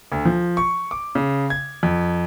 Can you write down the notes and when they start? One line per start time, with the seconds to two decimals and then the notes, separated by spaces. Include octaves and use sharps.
0.12 D2
0.25 F3
0.57 C#6
0.91 D6
1.15 C#3
1.50 G#6
1.83 F2